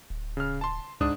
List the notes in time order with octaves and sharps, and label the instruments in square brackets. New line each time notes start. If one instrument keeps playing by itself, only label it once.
[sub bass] D1
[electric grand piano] C#3 F6
A5 C6
[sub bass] C#2 [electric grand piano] G#2 D4 D#6